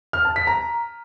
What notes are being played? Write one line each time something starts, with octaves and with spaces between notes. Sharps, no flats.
F6
A5
B6
A#5